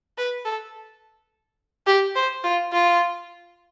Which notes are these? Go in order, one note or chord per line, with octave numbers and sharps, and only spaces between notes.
B4
A4
G4
C5
F4
F4